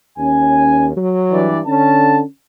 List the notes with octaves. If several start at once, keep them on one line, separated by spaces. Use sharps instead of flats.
D#2 C#4 G#5
F#3
G2 E3 D5
D3 C#4 A5